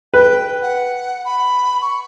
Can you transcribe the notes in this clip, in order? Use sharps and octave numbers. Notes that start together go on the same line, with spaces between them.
B4 G5
F#5
B5
C#6